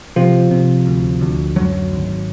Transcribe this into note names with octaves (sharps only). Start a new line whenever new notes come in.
C3 F3
C3
D2
D2
F#2 F#3
G#1